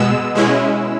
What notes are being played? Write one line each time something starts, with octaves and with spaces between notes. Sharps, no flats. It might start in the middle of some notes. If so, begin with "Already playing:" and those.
Already playing: B2 G#3 B3 E6
B2 G#3 C#4 E4